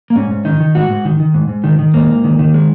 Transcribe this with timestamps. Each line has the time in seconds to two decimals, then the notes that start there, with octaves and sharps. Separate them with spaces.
0.10 A#3
0.15 G#2 C#4
0.31 G#2
0.45 D#3 D#4
0.60 D#3
0.75 G#2 F#4
0.90 G#2
1.05 D#3
1.20 D#3
1.34 G#2
1.49 G#2
1.64 D#3
1.79 D#3
1.94 G#2 A#3
2.09 G#2
2.24 D#3
2.39 D#3
2.54 G#3